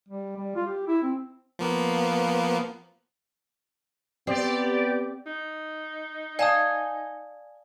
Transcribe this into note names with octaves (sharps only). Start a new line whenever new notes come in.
G3
G3
F4
G4
E4
C4
F3 A#3 B3
B3 C4 G4 D5
D#4
D5 F5 G#5 A5 D#6